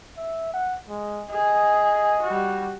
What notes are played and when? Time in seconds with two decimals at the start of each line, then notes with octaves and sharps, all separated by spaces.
0.17 E5
0.54 F#5
0.89 G#3
1.30 G#4 D#5
2.23 G3 F#4